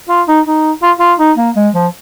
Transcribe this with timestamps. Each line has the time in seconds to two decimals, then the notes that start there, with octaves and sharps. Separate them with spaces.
0.09 F4
0.28 D#4
0.46 D#4
0.82 F4
1.00 F4
1.19 D#4
1.37 A#3
1.56 G#3
1.74 F3